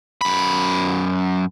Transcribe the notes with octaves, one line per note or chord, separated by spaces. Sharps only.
F#2 B5